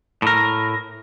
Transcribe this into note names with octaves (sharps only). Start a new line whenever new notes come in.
A2 A#4